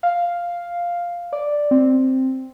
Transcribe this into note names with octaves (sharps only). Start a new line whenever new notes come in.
F5
D5
C4